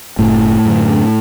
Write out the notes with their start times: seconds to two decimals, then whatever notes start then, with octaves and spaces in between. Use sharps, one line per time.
0.19 F#1 A2 A3
0.65 F#2 D3